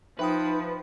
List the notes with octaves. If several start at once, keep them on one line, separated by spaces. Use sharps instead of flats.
F3 D#4 B4 E5 G5 D#6